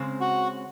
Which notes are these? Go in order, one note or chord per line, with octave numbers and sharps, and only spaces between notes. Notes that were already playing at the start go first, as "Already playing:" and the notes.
Already playing: C#3 G#3 C4
F#4